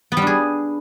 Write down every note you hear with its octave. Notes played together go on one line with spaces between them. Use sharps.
B3
G3
D4
G#4